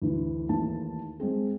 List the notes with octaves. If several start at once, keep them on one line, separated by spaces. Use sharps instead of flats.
D2 E3
D#2 E3 A3 A5
G#3 C4 G#4